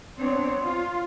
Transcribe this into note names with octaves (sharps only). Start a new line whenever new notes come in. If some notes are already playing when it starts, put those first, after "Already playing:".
B3 C4 D4 C5 C#5
F4